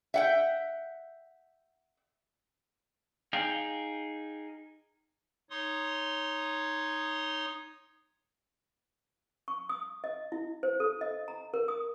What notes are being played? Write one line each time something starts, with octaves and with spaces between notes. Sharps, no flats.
E5 F#5 G5
D#4 G#4 F5 G5
D#4 C#5 C6 D#6
C#6
D#6
D#5
E4
C5
A4
D#5
A#5
A#4
D#6